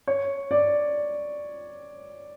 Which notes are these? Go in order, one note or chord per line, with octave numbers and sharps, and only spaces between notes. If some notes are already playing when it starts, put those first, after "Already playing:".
C#5
D5